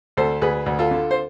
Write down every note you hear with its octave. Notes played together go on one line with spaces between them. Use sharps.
D2 A4 C5
D2 G#4 B4
D2
F4 A4
D3
C5